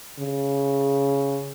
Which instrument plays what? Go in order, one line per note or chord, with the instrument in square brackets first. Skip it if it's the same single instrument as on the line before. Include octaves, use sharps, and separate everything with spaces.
[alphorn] C#3